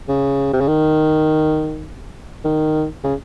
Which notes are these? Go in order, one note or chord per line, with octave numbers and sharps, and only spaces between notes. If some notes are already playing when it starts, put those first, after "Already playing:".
C#3
C3
C#3
D#3
D#3
C#3